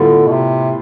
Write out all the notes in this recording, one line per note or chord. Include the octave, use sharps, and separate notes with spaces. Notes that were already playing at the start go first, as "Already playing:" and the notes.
Already playing: A2 D3 G3 B3 F4
B2
C3